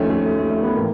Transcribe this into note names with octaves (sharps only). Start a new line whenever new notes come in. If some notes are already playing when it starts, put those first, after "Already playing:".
Already playing: D#2 D3 F3 A3 C#4
A3
A3
A3
A3
B3
A2 E3 A#3